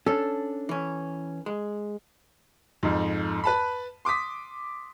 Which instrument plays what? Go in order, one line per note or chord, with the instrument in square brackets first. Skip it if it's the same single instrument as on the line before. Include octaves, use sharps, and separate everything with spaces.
[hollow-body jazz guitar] C#4 D4 [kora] A4
[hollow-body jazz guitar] E3 C#4
G#3
[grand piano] F2 G#2
B4 A5 B5
C6 D6 D#6 B6